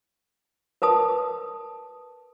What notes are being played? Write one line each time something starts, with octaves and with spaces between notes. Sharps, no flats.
A#4 B4 A5 D#6